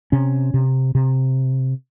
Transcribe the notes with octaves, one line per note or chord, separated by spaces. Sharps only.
C3 C#4
C3
C3